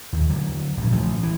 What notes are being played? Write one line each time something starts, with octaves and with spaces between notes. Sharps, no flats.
D#2
D3 F#3
A#1 G2
A1 E3 F3
E3